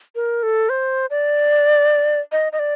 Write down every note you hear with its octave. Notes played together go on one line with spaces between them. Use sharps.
A#4
A4
C5
D5
D#5
D#5
D5